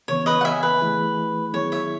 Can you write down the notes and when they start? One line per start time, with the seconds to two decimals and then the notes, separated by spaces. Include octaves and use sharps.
0.08 C#3 E3 B3 C#5
0.26 B4 D#5
0.41 F#5
0.45 E5 G#5
0.63 B4
0.81 E3 A3 E4 G#4
1.53 D#3 F#3 B3 E4 G#4 C#5
1.72 C#5 E5